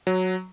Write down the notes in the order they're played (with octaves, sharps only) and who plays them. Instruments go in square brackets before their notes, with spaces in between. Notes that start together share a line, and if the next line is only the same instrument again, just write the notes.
[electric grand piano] F#3